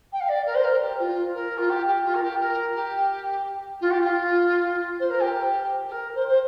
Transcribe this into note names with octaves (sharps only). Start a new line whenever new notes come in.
G5
F5
D5
A#4
C5
A#4
G4
F4
A#4
F4
G4
G4
F4
A#4
G4
A#4
G4
F4
G4
F4
C5
A#4
G4
G4
A#4
C5
C5